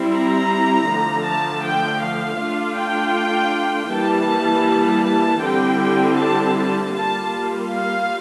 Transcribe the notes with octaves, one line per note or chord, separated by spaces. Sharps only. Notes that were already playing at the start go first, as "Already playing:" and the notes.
Already playing: G3 C4 E4
A#5
D3 F3 A3
A5
G5
F5
A3 D4 F4
G5
E3 G3 A#3 A5
A5
D3 G3 C4 E4 G5
A5
A5
G3 A#3 F4 A5
F5